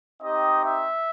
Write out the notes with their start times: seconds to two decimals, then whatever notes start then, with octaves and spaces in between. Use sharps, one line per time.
0.20 C4 D#4 G4 D#5
0.63 E5